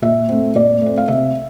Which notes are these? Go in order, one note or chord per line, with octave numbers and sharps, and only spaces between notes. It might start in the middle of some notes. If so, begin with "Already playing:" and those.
A#2 E5
A3 C4
A#2 D5
A3 C4
F5
C3 E5